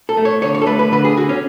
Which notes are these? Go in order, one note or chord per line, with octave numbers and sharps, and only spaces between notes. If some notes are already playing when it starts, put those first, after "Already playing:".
A4
A3
C#5
D3 C#5
C#5
A4
A3 B4
B4
D3 B4
G#4
D3 F#4
C#4